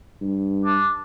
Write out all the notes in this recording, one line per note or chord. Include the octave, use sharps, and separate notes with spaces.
G2
D4